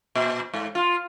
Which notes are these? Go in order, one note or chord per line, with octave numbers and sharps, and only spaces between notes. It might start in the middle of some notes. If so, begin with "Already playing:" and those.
A#2
G#2
F4